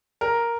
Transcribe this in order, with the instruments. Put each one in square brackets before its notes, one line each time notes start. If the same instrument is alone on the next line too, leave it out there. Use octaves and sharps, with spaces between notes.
[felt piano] A#4